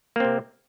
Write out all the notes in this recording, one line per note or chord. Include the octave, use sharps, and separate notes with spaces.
C3 A#3 C4